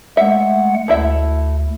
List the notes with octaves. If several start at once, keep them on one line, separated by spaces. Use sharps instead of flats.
G#3 A3 E5 F#5
D2 A3 E4 E5